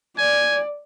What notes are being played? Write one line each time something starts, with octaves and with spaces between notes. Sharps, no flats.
D5 G#5